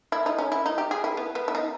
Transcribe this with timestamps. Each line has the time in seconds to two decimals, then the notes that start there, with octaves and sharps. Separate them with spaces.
0.12 E4
0.26 D#4
0.38 C#4
0.52 E4
0.66 D#4
0.78 G4
0.91 G#4
1.04 E4
1.17 B3
1.35 B3
1.48 E4
1.55 D#4